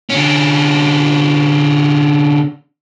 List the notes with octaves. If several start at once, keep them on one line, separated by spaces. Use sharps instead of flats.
D3 C#4